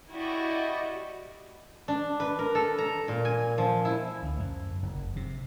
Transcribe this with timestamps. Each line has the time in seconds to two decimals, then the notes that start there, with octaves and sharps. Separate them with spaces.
0.11 E4 F#4 G4 D5 D#5
1.88 D4
2.20 B4
2.39 A#4
2.55 A4
2.78 A#5
3.08 A#2
3.25 G#5
3.58 F3
3.85 E4
4.23 D2
4.39 F#2
4.83 F#1
5.16 C3